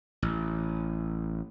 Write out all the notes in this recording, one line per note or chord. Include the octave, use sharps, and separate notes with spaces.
A1